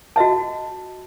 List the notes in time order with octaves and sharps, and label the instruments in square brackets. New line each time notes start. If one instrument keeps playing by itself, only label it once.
[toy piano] F#4 D#5 E5 A5